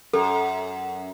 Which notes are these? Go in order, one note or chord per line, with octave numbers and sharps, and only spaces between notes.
F#2 A4